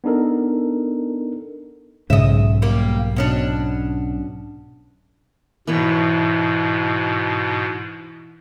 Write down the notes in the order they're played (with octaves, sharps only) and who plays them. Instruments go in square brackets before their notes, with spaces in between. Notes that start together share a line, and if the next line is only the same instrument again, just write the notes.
[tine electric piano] B3 D4 D#4 A4 A#4
[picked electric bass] B1 [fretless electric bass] G#2 C#3 [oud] D#5 E5
[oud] G3 A#3
B2 C#4 D4
[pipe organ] G#2 B2 [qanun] E3 B4 C#5